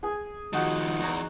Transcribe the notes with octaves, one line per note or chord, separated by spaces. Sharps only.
G#4 G#5
D#3 F3 D#4 F#4
E2 C#5 A#5